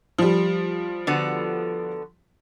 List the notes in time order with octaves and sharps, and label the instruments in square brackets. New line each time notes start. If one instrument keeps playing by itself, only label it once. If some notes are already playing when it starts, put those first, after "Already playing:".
[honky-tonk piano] F3 G3
[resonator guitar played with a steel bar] D3 B3 F#4